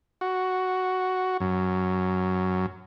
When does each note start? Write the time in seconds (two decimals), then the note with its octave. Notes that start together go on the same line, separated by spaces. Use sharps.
0.21 F#4
1.40 F#2